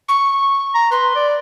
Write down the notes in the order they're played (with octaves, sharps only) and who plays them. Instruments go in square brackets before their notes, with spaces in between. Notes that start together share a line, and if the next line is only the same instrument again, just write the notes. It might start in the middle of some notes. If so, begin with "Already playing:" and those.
[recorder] C#6
[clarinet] A#5
[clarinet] B4 [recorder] C6
[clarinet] D5